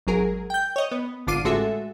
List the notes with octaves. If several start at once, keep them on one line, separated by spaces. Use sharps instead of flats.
G#1 F#3 G#4 A#4
G5 G6
C#5 D#5
B3
G#1 D3 F4 D6 C7 D#7
A1 G#3 F#4 A4 E5